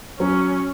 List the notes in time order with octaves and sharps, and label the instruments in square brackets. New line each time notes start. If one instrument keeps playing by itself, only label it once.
[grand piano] F#3 [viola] C#4